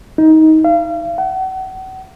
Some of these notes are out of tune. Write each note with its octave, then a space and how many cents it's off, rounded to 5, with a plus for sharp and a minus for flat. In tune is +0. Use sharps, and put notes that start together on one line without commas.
D#4 +20
F5 -35
F#5 +35